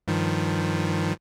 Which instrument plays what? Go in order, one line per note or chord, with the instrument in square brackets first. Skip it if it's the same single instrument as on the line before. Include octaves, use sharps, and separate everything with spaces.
[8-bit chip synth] G2 D#3 F3